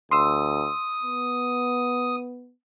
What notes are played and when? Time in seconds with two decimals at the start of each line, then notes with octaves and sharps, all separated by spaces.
0.11 D2 C6 D#6 E6
1.03 B3